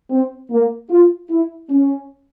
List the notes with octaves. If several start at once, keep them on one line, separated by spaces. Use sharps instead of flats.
C4
A#3
F4
E4
C#4